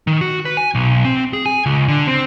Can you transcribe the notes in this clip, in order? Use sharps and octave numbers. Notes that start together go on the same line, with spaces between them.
D#3
F#4
B4
G#5
B1
C4
G#4
G#5
C#2
D3
C4